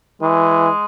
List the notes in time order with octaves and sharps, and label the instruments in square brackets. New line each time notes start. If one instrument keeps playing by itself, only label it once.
[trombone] E3 [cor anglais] G#3